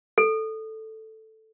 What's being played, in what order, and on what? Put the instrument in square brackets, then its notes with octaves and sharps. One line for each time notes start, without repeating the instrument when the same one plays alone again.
[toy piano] A4